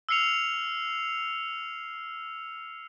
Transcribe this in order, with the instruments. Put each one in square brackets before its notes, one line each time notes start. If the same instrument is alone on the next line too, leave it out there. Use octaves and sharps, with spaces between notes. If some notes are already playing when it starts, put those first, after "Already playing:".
[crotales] E6 F6 C7 C#7 F7